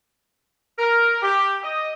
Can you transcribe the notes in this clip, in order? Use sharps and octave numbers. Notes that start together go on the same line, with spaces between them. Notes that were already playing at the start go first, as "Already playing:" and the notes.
A#4
G4
D#5